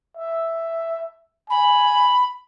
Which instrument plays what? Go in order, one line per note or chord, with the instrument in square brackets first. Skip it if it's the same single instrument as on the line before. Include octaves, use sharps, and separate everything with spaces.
[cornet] E5
[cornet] G#5 [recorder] B5